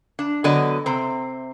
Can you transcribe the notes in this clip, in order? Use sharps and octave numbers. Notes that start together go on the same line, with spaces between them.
D4
D3 F#3 B3 D5 D#5
C3 C4